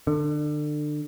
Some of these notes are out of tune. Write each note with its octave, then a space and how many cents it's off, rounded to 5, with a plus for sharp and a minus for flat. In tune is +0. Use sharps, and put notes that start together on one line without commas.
D3 +30